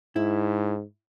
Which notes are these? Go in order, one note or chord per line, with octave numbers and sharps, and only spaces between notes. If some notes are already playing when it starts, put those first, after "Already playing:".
G#2 E4